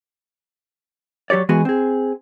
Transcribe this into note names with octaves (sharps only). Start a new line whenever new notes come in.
F#3 G4 C#5 D5
E3 G#3 B3 F#4 G#4
C4 G#4